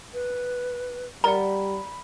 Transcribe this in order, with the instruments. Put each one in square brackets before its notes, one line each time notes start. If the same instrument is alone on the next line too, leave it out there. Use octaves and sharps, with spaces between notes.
[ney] B4
[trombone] G3 [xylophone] A#4 D5 F#5 [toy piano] A#5 [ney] B5